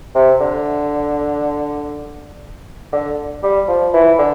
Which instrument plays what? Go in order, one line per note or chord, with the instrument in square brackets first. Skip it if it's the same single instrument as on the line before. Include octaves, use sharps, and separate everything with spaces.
[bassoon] C3
D3
D3
G3
F3
E3
D3